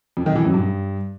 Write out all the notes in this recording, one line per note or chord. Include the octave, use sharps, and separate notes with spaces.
F2
D#3
E3
F#2
G2